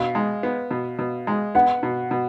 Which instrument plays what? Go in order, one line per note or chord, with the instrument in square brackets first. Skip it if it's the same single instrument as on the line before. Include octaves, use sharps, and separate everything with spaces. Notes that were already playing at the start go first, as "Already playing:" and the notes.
Already playing: [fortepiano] B2 [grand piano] F5
[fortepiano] G#3
B3
B2
B2
G#3
[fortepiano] B3 [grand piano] F#5
[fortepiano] B2
B2